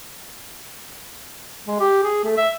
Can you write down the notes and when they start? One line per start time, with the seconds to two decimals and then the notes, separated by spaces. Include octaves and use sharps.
1.67 G#3
1.80 G4
2.03 G#4
2.24 A3
2.37 E5